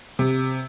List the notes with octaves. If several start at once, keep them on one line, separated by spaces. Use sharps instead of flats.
C3